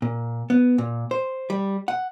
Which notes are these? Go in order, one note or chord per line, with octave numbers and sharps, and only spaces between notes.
A#2
B3
A#2
C5
G3
F#5